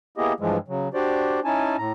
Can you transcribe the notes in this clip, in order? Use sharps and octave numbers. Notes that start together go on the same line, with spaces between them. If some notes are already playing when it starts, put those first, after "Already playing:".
A#3 B3 E4 G4 G#4 D#5
G2 E3 F3 G#3
C#3 F#3
D4 F#4 G4 C5 D5
C#4 D#4 E4 G#5 A5
A2 A#5